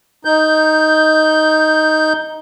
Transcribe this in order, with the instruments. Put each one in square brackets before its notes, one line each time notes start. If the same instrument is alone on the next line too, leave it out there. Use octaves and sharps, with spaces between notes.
[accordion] D#4 G6